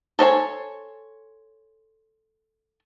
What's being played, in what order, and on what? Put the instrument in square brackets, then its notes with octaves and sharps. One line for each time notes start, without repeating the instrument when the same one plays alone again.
[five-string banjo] A4 C5 C#5 G#5